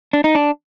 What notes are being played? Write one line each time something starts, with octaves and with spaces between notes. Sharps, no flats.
D4
D#4
D4